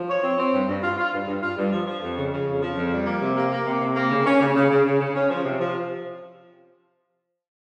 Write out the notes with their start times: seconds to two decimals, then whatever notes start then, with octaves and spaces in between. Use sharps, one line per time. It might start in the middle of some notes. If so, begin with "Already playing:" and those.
Already playing: F3
0.09 C#5
0.24 C4
0.38 C4
0.53 G2
0.68 G2
0.83 F4
0.98 F4
1.13 G2
1.27 G2
1.42 F4
1.57 G2
1.73 F3
1.87 F3
2.02 F2
2.17 C#3
2.32 C#3
2.47 F2
2.62 F3
2.77 F2
2.92 G3
3.06 A#3
3.22 C3
3.37 A#3
3.51 A#3
3.66 C3
3.81 C3
3.96 A#3
4.11 C#3
4.26 C#4
4.41 C#3
4.56 C#3
4.71 C#3
4.85 C#3
5.01 C#3
5.15 C#4
5.30 F3
5.45 C3
5.60 F3